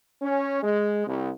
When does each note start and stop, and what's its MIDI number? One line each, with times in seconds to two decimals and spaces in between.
0.22 0.61 61
0.63 1.04 56
1.06 1.30 36